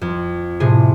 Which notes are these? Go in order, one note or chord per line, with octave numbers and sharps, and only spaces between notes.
F2
A2 C3 G#4